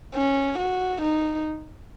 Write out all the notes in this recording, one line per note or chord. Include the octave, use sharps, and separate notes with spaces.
C#4
F#4
D#4